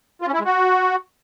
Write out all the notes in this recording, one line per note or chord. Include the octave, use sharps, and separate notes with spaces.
F4
C#4
E4
G#3
F#4